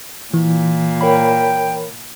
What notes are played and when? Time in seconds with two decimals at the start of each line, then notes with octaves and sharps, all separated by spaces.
0.34 A#2 E3
1.01 A#4 C#5 G5 B5